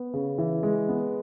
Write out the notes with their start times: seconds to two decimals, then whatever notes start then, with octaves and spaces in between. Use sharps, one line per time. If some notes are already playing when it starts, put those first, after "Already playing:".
Already playing: B3
0.13 C#3
0.38 E3
0.63 G#3
0.89 B3